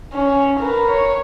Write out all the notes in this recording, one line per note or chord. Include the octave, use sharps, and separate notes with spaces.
C#4
A#4 B4
C#5